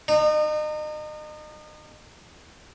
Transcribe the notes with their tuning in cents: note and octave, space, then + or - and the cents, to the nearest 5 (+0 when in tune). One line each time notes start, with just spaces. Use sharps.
D#4 -35